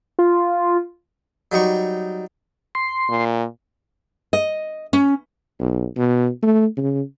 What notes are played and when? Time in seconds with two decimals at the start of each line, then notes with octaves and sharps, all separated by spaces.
0.19 F4
1.52 F#3 G3 D#4 C#6
2.75 C6
3.09 A#2
4.33 D#5
4.93 C#4
5.60 B1
5.97 B2
6.43 A3
6.77 C#3